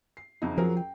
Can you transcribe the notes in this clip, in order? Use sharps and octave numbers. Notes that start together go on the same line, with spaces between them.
C7
F#1 F2 D#4
F3 F#3 G#4 A#4
G5